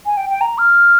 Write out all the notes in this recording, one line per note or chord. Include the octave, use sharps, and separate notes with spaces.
G#5
G5
G5
A#5
F6